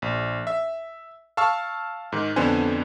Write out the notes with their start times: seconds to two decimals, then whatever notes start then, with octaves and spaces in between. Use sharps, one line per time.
0.02 A#1
0.47 E5
1.37 F5 A5 C#6 E6 F6
2.12 G#2 D#3
2.36 F2 D3 B3 D4 C5 G#5